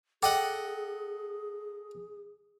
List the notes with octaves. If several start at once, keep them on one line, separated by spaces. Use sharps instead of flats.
G#4 A4 D#5 F#5 G5 D6